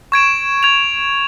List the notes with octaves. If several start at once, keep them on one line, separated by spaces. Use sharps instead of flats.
C#6 G#6 D7 E7
G#6 F7